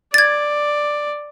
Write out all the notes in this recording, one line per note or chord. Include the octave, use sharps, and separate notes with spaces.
D5 G#6 A6